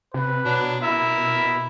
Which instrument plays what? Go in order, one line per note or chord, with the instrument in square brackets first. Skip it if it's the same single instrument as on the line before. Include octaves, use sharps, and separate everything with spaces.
[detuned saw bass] C3 [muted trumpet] B4
[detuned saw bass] B2 [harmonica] F#3 D4
[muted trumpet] E4 [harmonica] A#4 E5